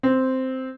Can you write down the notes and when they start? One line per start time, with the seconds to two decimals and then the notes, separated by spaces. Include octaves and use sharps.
0.03 C4